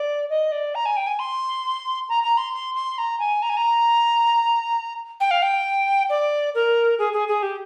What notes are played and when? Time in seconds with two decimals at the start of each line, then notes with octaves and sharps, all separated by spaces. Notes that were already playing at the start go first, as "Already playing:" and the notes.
Already playing: D5
0.30 D#5
0.52 D5
0.75 A#5
0.86 G#5
0.97 G5
1.07 G#5
1.19 C6
2.09 A#5
2.23 A#5
2.38 C6
2.53 C6
2.75 C6
2.98 A#5
3.20 G#5
3.42 A#5
3.49 G#5
3.57 A#5
5.20 G5
5.31 F5
5.42 G5
6.10 D5
6.55 A#4
6.99 G#4
7.13 G#4
7.28 G#4
7.43 G4